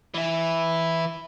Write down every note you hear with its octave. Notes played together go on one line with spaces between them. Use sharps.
E3 E4